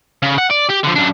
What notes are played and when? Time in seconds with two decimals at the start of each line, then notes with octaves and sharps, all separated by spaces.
0.22 C#3
0.38 F#5
0.51 D5
0.70 G4
0.84 D3 F3
0.96 F#2 D4